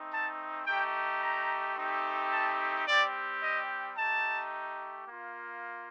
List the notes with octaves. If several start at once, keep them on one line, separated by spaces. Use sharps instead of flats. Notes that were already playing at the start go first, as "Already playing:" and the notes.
Already playing: A3 C4 D#4
A5
A3 D#4 G4 G5
A#5
A3 C4 D#4 G4
A5
G3 C4 G4 D5
D#5
A3 D#4 G4 A5
A#3 F4